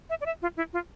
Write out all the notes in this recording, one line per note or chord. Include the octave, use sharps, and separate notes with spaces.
E5
D5
E5
F4
E4
F4